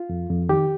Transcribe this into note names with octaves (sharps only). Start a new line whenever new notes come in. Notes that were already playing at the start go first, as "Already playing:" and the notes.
Already playing: F4
F2
F2
D#3 G4